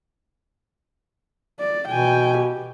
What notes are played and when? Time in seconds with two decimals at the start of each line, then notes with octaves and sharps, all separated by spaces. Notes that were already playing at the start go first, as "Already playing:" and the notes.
1.60 D5
1.88 B2 G5 G#5
2.38 G4